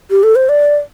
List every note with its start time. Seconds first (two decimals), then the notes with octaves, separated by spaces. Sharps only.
0.11 G4
0.23 A4
0.36 C5
0.49 D5